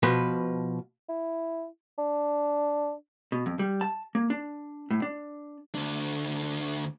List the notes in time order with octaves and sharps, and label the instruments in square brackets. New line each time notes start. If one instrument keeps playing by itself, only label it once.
[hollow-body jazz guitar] B2 F3 B4
[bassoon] E4
D4
[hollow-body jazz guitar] B2
F2
G3
A5
A#3
D4
A2
D4
[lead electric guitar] D2 D4